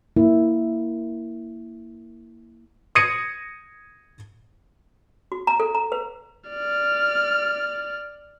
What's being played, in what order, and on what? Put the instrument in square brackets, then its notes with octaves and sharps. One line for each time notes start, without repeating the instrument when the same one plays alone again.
[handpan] A#3 E4
[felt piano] D#6 G#6 A#6 C#7 D#7
[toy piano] F#4
A#5
A4
A#5
B4
[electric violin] D5 F6